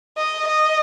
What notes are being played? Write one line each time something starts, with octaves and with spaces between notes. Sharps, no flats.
D#5
D#5